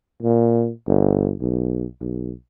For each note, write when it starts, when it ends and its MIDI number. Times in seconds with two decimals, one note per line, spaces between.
0.22 0.70 46
0.86 1.33 31
1.41 1.85 35
2.00 2.32 35